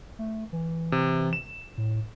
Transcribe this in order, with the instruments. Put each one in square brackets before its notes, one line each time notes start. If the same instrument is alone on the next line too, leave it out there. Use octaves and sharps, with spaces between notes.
[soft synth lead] A3
E3
[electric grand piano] C3
E7
[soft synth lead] A2